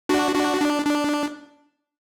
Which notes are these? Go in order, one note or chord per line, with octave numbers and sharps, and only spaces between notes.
D4 F#4
D4 F#4
D4
D4